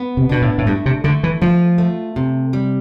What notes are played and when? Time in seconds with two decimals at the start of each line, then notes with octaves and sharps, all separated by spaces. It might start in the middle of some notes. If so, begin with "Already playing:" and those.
Already playing: B3
0.17 C3
0.29 B2 D4
0.42 A2
0.58 A2
0.66 G2 A3
0.86 C3
1.04 D3 A3
1.23 E3
1.42 F3 F4
1.78 A3
2.16 C3
2.53 G3